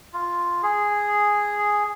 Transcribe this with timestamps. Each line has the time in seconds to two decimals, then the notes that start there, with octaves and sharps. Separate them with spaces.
0.13 F4
0.63 G#4